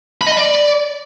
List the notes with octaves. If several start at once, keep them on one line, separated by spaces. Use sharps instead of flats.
B5
D#5
B5
D5